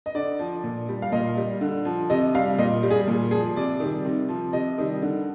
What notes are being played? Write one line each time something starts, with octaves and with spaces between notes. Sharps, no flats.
D#5
D3 D5
F3
A#2
G3
F5
A#2 D#5
G3
D3
F3
C3 D#5
G3 F5
A#2 D#5
G3
G#4
A#2
F3 G#4
C3 D5
D#3 G3
C3
F3
C3 D#5
D#3 G3
D3